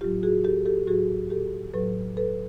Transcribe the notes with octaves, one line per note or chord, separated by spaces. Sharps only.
A2 F#3 F4 G4
F#4 G#4
G4 A4
G4 A4
A2 F#3 F#4 G#4
G4 A4
A2 F#3 A4 B4
A4 B4